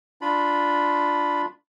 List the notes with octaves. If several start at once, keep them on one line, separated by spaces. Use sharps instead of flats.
D4 F4 B5